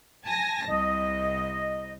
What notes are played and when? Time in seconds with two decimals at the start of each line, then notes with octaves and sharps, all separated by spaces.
0.24 G#5 A5 A#6
0.67 C2 D#5